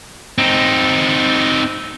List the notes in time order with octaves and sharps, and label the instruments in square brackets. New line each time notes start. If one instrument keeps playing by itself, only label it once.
[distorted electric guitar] C4 D#4